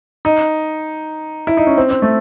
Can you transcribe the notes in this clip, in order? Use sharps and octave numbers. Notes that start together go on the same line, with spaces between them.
D#4
E4
D#4
C#4
C4
C4
A3